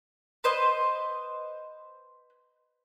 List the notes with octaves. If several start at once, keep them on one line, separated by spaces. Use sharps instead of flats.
B4 C5 D#5